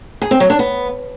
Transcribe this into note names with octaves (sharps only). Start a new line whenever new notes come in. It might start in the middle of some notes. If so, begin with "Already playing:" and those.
G#4
C4
F#3
D4
B3